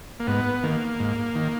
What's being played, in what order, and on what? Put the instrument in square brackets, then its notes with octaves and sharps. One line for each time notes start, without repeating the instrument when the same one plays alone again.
[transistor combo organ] A#3
G#2 B3
D#3 A#3
G#2
D#3